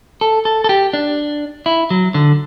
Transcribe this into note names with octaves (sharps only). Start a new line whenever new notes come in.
A4
A4
A4
G4
D4
E4
F#3
D3